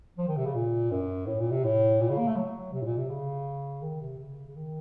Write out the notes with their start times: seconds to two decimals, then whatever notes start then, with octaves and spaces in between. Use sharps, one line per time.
0.18 F3
0.28 D#3
0.37 C3
0.46 C#3
0.55 A#2
0.91 F#2
1.27 A2
1.40 A#2
1.51 C3
1.64 A2
2.01 A#2
2.10 C#3
2.18 A#3
2.28 A3
2.36 F#3
2.73 C3
2.81 A2
2.85 A#2
2.98 C3
3.10 C#3
3.82 D#3
4.01 C3
4.18 C#3
4.48 C#3
4.56 D#3